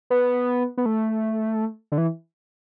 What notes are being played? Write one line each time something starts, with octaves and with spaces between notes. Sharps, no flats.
B3
B3
A3
D3
E3